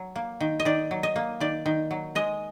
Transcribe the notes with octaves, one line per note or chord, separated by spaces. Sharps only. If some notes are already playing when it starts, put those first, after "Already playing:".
Already playing: F#3
A#3
D#3
D#5
D#3 D5
F#3
D#5
A#3
D#3 D5
D#3
F#3
G#3 D#5